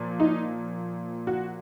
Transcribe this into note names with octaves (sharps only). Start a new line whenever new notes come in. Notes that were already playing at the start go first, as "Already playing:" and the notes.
Already playing: A#2 F3
D#4
F#4